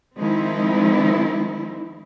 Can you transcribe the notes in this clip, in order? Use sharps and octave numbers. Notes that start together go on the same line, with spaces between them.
D#3 F3 G#3 C4 D#4 E4